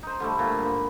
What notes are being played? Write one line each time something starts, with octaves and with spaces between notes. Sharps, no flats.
D#4 C5
D3 G3 A3
A#2
G#2 B5